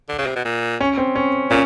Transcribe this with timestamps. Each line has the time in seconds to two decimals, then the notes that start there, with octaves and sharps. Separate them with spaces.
0.09 D3
0.18 C#3
0.27 C3
0.36 B2
0.45 A#2
0.81 C#4
0.98 C4
1.15 C#4
1.51 A#2 C#4